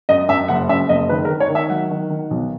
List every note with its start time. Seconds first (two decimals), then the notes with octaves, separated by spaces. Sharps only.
0.09 F#2 D#5
0.28 F#2 E5
0.48 F#1 F#5
0.69 F#2 E5
0.89 F#1 D#5
1.09 D#3 B4
1.25 A#4
1.30 D#3
1.40 C#5
1.49 D#3
1.55 E5
1.70 F#3 F#5
1.91 D#3
2.10 D#3
2.31 B1